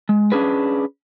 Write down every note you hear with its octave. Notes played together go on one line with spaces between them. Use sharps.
G#3
C#4 D4 G#4 B4